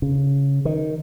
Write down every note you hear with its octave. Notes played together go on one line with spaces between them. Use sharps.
C#3
D#3